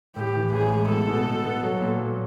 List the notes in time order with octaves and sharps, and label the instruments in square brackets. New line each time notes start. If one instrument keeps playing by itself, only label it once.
[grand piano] A2 [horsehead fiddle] G4
[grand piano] E3
[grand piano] A1 [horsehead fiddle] G#4
[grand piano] G#3
[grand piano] B2 [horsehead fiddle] A4
[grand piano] B2
B2
B3
F#3
A#2
F#3